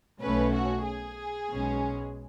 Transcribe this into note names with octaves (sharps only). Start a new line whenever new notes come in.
B1 B2 A3 C#4 B4
F#4
G#4
B1 B2 G#3 C#4